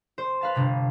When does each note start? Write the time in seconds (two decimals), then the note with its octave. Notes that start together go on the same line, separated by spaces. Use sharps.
0.18 C5
0.41 B4 F5 A5
0.54 G1 C3 B6